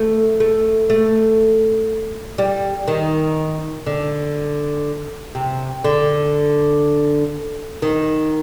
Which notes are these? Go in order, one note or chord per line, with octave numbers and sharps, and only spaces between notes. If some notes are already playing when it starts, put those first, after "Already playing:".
Already playing: A3
A3
A3
G3
D#3
D3
C3
D3
D#3